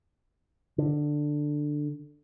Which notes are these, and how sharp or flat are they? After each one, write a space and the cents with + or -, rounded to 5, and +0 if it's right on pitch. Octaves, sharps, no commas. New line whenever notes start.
D3 +10